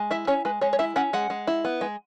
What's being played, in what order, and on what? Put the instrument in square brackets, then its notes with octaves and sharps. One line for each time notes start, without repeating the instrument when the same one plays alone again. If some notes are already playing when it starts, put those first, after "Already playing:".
Already playing: [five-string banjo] G#3
E4 E5
C#4 C#5
G#3 B4
G#3 C#5
C#5
E4 E5
C#4 F#5
G#3 F#5
G#3
E4
B3
G#3